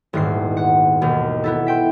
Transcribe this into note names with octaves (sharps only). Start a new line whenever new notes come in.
D#1 E2 G#2 D#3 C4 C7
F#5
E1 D#2 B2 D#3
B3 E4 A4
E5 G5 C6